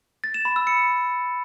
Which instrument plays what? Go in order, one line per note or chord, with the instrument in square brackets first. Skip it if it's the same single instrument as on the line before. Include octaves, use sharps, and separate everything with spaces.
[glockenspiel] A6
E7
B5
E6
C#7